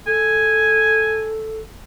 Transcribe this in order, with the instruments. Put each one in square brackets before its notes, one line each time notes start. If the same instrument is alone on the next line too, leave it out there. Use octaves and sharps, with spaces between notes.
[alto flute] A4 [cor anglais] G#5